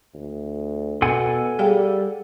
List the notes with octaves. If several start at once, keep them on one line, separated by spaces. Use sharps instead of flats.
D2
B2 A4 F#5 G#5
G3 G#4 F5 G5